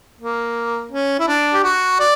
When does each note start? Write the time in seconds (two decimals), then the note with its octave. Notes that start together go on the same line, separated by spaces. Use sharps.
0.21 A#3
0.92 C#4
1.19 E4
1.28 D4
1.54 G4
1.64 F#4
2.00 D5